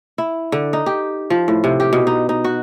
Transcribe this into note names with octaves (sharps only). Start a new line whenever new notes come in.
E4
D3
D#4
G4
F3
A2
C3
G4
B2
D#4
D#4
F#4